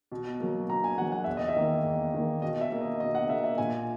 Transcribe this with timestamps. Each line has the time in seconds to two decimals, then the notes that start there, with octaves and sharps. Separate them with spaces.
0.12 B2
0.40 F#3 A#3
0.69 B2 A#5
0.84 G#5
0.98 A#3 F#5
1.01 F#3
1.12 F#5
1.24 E2 E5
1.37 D#5
1.48 E5
1.56 D#3 A#3
1.84 E2
2.14 D#3 A#3
2.42 B2 D#5
2.61 E5
2.72 A#3
2.81 D#5
3.00 B2 D#5
3.15 F#5
3.29 A#3 E5
3.44 E5
3.58 A#2 G#5